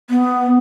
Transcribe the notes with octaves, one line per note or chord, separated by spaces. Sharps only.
B3